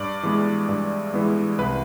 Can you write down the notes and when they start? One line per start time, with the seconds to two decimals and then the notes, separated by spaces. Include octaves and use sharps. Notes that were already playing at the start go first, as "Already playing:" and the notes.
Already playing: G2 D5
0.23 E3 G#3 B3
0.69 G2
1.14 E3 G#3 B3
1.58 C2 B4